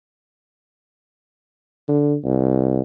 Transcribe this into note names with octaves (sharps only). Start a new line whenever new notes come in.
D3
C2